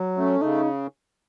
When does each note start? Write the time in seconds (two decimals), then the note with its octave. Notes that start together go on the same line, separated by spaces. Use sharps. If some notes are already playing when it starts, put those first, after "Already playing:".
Already playing: F#3
0.17 A3 C#4
0.41 C#3 D#4